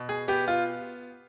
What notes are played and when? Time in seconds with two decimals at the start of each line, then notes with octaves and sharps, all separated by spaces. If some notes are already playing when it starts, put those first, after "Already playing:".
Already playing: B2
0.09 G#4
0.28 B3 G4
0.48 F4